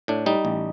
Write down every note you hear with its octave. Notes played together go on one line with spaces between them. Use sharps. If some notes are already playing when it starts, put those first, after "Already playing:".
A2 D4
G3 D#4
A1